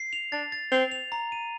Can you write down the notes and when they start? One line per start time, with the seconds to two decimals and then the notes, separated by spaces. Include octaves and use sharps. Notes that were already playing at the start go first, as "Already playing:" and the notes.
Already playing: C7
0.13 F7
0.32 D4 A6
0.52 A6
0.72 C4 F7
0.91 F7
1.12 A#5
1.32 D#7